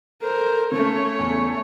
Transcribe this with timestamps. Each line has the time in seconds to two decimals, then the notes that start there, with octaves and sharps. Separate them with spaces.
0.22 A4 A#4 C5
0.72 C#3 A3 C#5
1.19 E2